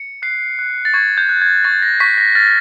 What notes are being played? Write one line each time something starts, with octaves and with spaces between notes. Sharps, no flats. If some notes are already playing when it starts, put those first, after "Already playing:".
Already playing: C#7
F#6 C7
F#6
A6
C#6 G#6
G6
F#6
G#6
C#6 A6
A#6
C#6 B6
A#6
F6 A6